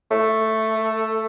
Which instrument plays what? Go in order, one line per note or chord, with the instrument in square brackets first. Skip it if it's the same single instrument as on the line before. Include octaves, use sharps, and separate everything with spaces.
[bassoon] A3